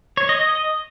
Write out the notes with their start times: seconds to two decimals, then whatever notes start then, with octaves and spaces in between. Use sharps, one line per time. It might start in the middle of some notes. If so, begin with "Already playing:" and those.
0.17 C#5
0.29 D#5
0.41 D#5